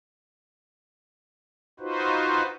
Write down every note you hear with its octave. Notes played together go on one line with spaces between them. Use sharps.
D#4 F4 F#4 B4 C5